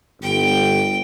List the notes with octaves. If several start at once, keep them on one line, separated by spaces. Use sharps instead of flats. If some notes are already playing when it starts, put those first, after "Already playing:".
G1 G5